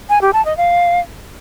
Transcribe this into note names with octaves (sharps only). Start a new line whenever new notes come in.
G#5
G4
A5
D#5
F5